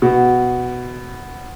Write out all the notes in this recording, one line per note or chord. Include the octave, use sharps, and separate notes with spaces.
B2